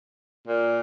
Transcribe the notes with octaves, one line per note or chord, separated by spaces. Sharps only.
A#2